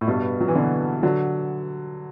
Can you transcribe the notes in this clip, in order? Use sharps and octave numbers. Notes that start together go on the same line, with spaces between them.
A2
G2 B2
F#3
E3
B2 D3
D3 F#3